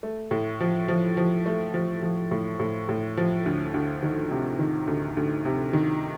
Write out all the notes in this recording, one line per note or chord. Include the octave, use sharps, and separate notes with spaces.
A3
A2
F3
F3
F3
A3
F3
F3
A2
A2
A2
F3
D2
D2
D#3
C3
D#3
D2
D2
C3
D#3